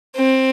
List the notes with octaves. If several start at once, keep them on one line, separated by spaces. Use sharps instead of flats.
C4